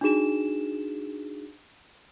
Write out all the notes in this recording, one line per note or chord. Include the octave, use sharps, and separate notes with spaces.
D4 D#4 F#4 G#4 E7